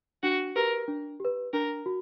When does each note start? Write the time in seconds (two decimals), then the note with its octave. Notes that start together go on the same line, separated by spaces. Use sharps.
0.23 D4 F#4
0.56 G4 A#4 B4
0.88 D4
1.20 G4 B4
1.53 D4 A#4
1.86 F#4